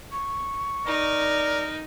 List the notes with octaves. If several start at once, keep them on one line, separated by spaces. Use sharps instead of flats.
C#6
D#4 A#4 D5